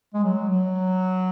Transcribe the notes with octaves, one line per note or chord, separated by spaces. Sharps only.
G#3
F#3
F#3